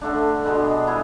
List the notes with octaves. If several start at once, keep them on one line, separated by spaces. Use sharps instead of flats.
D3 A3 D4
B2 G#3 B3 D4
G#3 B3 E4 G#4